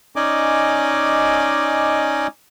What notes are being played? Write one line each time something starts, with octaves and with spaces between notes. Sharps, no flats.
C#4 D#4 D5 D#5 G#5 D6